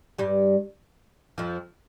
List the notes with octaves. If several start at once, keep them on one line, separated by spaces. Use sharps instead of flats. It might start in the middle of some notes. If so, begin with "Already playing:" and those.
G2 G3
F2 F3